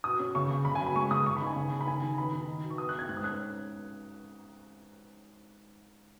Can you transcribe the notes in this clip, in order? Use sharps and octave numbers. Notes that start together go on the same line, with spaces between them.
B2 D#6
C#4
C#3 C#6
C#3
C#3 B5
G#5
F#3
B5
G#3 C#6
C#3 D#6
C#3 C#6
B5
D#4
G#5
C#3
C#3
B5
D#3 G#5
D#3
B3 B5
D#3
D#4
B2
C#6
B3 D#6
F#6
B3
G#6
G#2 F#6
D#6
C#4 F#6